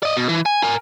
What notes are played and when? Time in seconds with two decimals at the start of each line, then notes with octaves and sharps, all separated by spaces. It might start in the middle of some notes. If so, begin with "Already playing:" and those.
0.03 D5 D#5
0.17 B2
0.29 E3
0.46 G#5
0.63 A#4 G#5